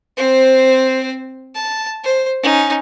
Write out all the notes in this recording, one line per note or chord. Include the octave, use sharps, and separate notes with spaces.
C4 C5
A5
C5
C#4 D#4